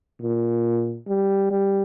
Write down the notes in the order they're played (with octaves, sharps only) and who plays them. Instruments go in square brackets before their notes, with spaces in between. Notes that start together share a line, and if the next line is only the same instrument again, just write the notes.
[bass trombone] A#2
G3
G3